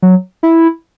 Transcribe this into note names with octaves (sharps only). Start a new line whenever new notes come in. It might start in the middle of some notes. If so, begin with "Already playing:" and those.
F#3
E4